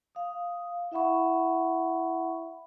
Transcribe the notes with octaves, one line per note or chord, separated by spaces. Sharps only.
F5 D#6
E4 E5 F#5 B5 C#6